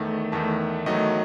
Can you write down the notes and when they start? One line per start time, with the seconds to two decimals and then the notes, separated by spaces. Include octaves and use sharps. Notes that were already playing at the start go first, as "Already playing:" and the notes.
Already playing: E2 D#3 A3
0.32 E2 D#3 A3 A5
0.86 E2 D#3 F#3 A3 D#5